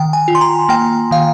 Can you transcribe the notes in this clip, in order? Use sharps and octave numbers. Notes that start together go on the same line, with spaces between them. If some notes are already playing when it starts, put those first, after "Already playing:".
Already playing: D#3 G5
G#5
F4
C6
A#5
A#3 G5
D#3 F5